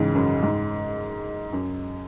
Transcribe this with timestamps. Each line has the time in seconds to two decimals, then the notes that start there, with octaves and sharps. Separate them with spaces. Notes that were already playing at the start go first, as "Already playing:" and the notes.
Already playing: G#2 C#3 E3
0.15 F#2
0.43 G#2
1.52 F#2